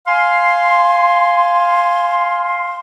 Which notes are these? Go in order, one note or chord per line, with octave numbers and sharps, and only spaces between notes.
F5 G#5 C6